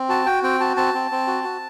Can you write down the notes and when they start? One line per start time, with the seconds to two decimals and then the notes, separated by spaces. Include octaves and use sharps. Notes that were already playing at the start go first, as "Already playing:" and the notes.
Already playing: C4
0.09 F#4 A5
0.26 F#4 G5
0.43 C4 G5
0.60 F#4 A5
0.77 C4 A5
0.94 C4
1.11 C4
1.27 F#4
1.44 F#4